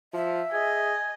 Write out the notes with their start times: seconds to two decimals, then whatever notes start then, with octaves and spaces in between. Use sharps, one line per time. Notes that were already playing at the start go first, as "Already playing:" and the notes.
0.14 F3 E5
0.52 G#4 D#5 G#5